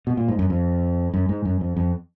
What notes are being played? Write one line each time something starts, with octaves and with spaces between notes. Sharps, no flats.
B2
A#2
G#2
F#2
F2
F#2
G#2
F#2
F2
F2